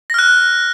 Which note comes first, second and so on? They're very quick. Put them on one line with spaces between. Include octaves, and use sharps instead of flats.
A#6 F6 F#6